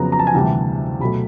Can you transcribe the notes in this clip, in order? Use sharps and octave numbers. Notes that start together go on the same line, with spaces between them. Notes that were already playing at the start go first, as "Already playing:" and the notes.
Already playing: F2 C#3 F#3 B3 A#5
A#5
A5
G#5
D2 C3 E3 G3 A5
B2 F#3 A3 B5